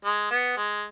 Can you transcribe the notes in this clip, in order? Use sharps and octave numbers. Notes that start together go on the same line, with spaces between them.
G#3
B3
G#3